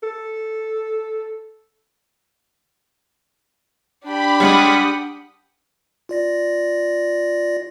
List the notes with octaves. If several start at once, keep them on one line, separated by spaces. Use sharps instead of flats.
A4
D4 G4 B5
G3 G#3 F#5 D#6
F4 D5 A#6